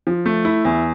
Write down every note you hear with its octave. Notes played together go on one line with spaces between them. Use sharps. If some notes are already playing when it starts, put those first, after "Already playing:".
F3
A3
E4
E2